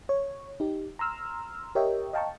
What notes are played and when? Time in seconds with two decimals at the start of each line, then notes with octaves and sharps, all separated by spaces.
0.09 C#5
0.60 D#4 G4
0.99 A#5 C6 E6 F6
1.75 G4 A#4 C#5 D#5 E5 G5
2.13 D#5 F5 G5 A5 A#5 C#6